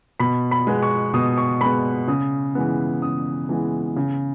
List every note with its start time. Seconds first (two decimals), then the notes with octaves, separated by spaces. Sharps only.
0.20 B2 B5
0.51 B5
0.67 G#3 B3
0.83 C#6
1.14 B2 D#6
1.38 C#6
1.61 G#3 B3 B5
2.08 C#3 D#6
2.55 E3 G#3 B3
3.02 C#3 D#6
3.49 E3 G#3 B3
3.96 C#3